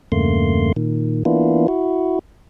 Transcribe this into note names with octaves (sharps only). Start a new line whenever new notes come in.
E2 G2 C#3 A3 A#3 C6
A#2 D#3
E3 A#3 B3 D4 E4 F4
E4 F#4